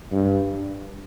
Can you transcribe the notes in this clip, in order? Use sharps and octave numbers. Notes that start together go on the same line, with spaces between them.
G2